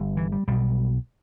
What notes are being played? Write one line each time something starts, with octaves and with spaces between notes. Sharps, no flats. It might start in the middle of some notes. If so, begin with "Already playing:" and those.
Already playing: G1 G2
E3
G3
B1 B2 G3